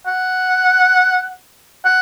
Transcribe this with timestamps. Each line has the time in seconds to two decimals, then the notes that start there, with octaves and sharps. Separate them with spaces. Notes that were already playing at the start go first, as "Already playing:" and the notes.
0.07 F#5
1.85 F#5